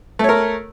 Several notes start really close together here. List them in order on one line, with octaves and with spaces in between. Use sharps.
A3 C#5 A#4